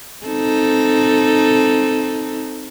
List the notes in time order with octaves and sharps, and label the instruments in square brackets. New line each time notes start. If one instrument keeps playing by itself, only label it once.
[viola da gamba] C4 D#4 A4